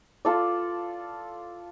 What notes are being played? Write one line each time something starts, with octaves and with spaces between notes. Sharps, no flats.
F4 A4 D5